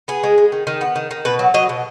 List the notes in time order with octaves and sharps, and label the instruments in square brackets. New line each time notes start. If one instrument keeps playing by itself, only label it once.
[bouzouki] B3 G#4
G#3
G#3
D#3
D#3
B3
D#3
D#3
B2 B4
F#3
F#3 D#5
B2